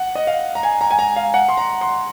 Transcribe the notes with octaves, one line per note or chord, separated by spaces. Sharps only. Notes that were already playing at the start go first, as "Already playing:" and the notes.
Already playing: F#5
D#5
F5
A#5
G#5
A#5
G#5
A#5
F5
F#5
C6
A#5
C6